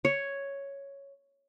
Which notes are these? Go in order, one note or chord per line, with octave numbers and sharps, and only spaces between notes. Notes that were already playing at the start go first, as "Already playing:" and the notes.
C#5